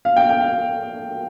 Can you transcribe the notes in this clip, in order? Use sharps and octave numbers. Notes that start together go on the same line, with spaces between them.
F5
G5
G5
F5